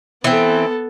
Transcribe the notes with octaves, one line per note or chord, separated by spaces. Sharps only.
E3 B3 C4 A4